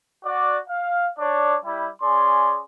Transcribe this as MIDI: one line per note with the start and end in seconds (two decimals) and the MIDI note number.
0.24 0.59 66
0.24 0.59 74
0.69 1.08 77
1.19 1.57 62
1.19 1.57 73
1.19 1.57 74
1.65 1.89 55
1.65 1.89 64
2.02 2.61 61
2.02 2.61 68
2.02 2.61 74
2.02 2.61 84